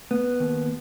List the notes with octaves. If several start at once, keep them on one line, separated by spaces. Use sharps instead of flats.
B3
D#2